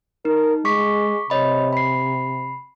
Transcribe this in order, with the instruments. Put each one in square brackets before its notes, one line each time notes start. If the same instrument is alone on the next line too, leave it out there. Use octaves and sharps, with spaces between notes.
[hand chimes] D#4 [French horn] A#4
[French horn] G#3 [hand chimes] C#6 D6 B6
[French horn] C3 [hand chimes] C#5 D#5 B5
[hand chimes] B5 C7